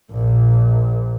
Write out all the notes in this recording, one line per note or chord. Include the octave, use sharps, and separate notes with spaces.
A#1 A#2